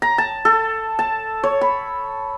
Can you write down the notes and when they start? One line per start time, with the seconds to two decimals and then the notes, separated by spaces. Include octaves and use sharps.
0.02 A#5
0.18 A5
0.45 A4
0.99 A5
1.43 C#5
1.61 B5